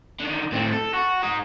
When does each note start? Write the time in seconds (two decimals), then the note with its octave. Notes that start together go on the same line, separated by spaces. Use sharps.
0.20 D3 D#3
0.52 A2 C4
0.72 A4
0.94 F#4
1.23 D#4 G#4